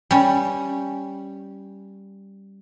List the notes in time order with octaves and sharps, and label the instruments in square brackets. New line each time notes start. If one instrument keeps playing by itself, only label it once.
[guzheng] G3 C#4